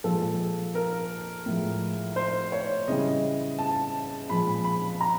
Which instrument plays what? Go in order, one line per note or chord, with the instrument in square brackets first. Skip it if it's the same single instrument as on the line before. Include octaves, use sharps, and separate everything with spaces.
[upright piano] A#2 F3 G#3 A4
A#4
A2 F3 G#3
C5
C#5
C#3 E3 G3 D#5
A5
A#2 F3 G#3 B5
B5
A#5